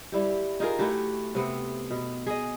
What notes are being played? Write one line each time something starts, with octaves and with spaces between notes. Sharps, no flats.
G3 E4 G4
D#4 F4 G#4 A#4
A3 E4 F#4 G4
C3 B3 C4
B2
G#4 D#5